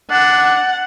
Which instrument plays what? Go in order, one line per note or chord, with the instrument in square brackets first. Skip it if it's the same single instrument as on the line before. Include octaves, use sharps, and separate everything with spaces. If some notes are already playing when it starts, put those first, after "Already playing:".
[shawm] D4 [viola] F#5